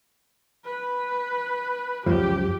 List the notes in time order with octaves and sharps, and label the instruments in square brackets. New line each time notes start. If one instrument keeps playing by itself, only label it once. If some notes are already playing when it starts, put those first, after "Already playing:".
[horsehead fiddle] B4
[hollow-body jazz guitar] C#2 F#2 F3 [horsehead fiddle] G4